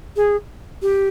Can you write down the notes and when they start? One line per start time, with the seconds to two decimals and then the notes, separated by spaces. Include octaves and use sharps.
0.16 G#4
0.82 G4